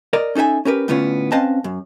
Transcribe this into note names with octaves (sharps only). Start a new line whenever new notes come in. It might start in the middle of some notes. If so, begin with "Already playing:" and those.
A#4 D5 D#5
C#4 D#4 A4 E5 G#5
C#4 G4 A#4 B4
A2 D3 B3 C#4 F4
C4 C#4 B4 D#5 F5 A5
F#2